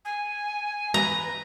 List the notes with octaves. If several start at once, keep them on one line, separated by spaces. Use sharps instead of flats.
G#5
B4 A#5